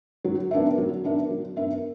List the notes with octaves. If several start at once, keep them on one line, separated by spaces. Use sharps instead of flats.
F#3
B3 D4 A#4 E5
F#3
B3 D4 A#4 E5
F#3
B3 D4 A#4 E5